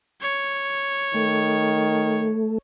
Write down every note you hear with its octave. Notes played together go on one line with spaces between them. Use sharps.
C#5
D#3 A3